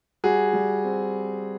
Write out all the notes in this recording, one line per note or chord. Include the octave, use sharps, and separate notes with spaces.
G3 F#4 G#4
G3
C4